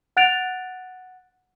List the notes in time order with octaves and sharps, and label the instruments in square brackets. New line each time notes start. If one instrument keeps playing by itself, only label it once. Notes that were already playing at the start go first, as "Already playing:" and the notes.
[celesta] F#5 F#6 A6 D7 F7